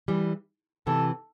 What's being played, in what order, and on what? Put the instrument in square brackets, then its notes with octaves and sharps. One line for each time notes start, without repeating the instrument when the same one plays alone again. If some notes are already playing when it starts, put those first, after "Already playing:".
[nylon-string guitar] E3 G3
[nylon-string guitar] C3 E3 [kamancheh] A4